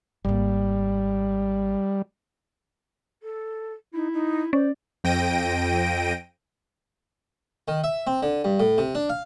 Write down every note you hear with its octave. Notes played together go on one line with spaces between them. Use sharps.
G#1 G3 A#3
A4
D#4 E4
D#4
C#4 C5 D5
F2 G5 A#6 D7 D#7
D#3
E5
C4
D3
G2
A2
C3
D4
F5